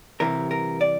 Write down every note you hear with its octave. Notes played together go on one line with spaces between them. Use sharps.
C2 C3 E3 A#4
A#4
D5